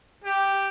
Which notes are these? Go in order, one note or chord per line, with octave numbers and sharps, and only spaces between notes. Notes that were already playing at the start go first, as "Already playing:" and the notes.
G4